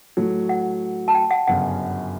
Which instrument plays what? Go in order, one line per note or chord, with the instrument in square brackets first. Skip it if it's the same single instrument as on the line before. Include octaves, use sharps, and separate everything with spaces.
[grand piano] A2 F#3 A3
[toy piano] F#5
A5
G5
F#5
[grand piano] G1 F#2 C#3 [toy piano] F#5